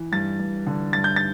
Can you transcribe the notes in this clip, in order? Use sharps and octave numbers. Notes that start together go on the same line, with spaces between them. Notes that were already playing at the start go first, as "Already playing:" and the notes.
Already playing: E3
G2 A6
G2
D3
G2 A6
G6
A6